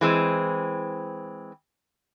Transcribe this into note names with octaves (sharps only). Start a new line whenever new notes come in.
E3 G#3 C4